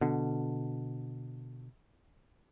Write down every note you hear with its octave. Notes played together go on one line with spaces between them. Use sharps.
B2 D3